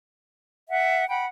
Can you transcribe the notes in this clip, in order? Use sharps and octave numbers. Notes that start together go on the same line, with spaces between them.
E5 F#5
F#5 G5 B5